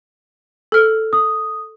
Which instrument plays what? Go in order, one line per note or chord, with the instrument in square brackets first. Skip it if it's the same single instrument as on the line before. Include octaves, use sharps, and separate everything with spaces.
[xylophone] A4 F6
[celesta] D#6